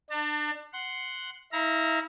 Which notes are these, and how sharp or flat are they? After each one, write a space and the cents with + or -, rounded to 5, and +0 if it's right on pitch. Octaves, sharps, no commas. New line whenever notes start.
D4 +30 A5 +45
F#5 +0 C6 +0
E4 -35 F5 -45 A#5 +0